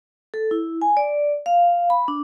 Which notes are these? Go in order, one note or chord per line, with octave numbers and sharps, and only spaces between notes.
A4
E4
G#5
D5
F5
B5
D4